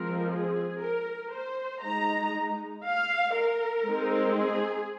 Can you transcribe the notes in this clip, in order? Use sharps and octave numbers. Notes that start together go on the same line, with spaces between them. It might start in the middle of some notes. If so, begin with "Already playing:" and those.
Already playing: F3 G#3 C4 A#4
G#4
A#4
C5
G#3 D#4 A#5
F5
A#4
G#3 C4 D#4
G#4